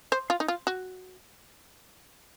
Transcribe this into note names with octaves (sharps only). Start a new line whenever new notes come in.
C5
F4
D#4
F4
F#4